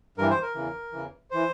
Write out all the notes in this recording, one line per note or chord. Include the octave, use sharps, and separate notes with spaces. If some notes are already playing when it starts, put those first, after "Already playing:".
G2 E3 A#4
C5
A#4
E2 C#3 E3
E2 C#3 E3
E3 C5